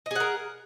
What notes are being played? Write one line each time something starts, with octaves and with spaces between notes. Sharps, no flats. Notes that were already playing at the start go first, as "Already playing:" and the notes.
G#4 A#4 D#5 F#5